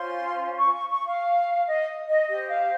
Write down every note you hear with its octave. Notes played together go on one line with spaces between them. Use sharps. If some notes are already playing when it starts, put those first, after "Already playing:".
Already playing: C#4 F4 C5 C6
C#6
C#6
C#6
F5
D#5
D#5
G4 C5 D#5
F5